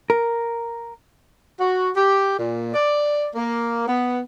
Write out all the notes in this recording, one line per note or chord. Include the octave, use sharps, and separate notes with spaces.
A#4
F#4
G4
A#2
D5
A#3
B3